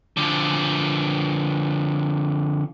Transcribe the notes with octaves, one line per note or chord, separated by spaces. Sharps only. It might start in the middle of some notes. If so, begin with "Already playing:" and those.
D3 F3